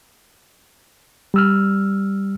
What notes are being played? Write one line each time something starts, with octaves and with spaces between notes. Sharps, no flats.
G3 E6 F6